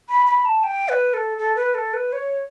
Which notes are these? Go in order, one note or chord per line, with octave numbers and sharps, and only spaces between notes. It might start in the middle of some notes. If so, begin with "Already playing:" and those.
B5
B5
A5
G5
B4
A4
A4
B4
A4
B4
C#5